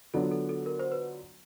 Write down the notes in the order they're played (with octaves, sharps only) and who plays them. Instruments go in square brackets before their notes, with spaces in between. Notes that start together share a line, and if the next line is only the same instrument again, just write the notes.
[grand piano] D3 F#3 B3 D4 F4 [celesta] A4
[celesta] A4
A4
A#4
C5
B4